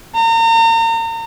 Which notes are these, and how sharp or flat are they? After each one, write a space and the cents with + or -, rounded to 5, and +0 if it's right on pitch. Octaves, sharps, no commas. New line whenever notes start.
A#5 -35